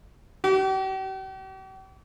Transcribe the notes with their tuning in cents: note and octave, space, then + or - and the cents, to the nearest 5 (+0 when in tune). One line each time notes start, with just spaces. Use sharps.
G4 -45